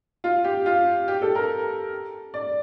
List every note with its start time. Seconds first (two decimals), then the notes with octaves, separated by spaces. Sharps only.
0.24 F4
0.44 G4
0.66 F4
1.08 G4
1.22 A4
1.35 A#4
2.34 D5